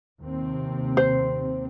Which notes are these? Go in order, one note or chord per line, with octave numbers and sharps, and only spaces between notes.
D#2 C3 C4
C5